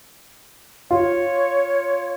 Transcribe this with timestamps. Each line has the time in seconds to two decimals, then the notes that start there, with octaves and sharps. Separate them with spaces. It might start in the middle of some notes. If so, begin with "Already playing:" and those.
0.91 F4 C#5